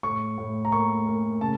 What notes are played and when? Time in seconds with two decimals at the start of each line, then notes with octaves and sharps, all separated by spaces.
0.03 A2 C#6
0.38 A2
0.65 A#5
0.72 A#3 C#6
1.06 A#3
1.41 C#3 A5